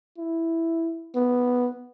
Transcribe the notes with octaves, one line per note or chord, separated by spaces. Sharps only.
E4
B3